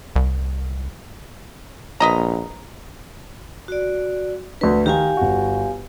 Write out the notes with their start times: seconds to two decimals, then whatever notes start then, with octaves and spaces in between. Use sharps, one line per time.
0.16 C2
2.00 A#1 B4 D#5 A#5
3.68 F#4 D5
4.61 D2 D4 B4
4.86 D#3 D#4 G4 F5 G#5
5.17 G1 F#4